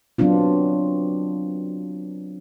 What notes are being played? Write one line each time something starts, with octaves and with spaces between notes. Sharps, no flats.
F#3 B3 C4 D4 F4